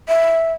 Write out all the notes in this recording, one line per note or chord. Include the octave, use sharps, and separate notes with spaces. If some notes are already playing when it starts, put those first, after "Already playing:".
E5